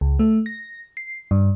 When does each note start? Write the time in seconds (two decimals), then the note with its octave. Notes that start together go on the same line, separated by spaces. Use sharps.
0.01 C#2
0.19 A3
0.46 A#6
0.97 C7
1.31 G2